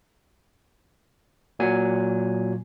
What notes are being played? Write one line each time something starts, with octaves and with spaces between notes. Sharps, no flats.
A#2 F#3 G#5